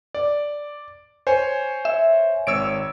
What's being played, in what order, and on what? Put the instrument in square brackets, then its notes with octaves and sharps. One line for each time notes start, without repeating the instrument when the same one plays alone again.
[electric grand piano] D5
C5 C#5 G#5
[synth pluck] E5
[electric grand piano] G#1 C#5 E6 [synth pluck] D7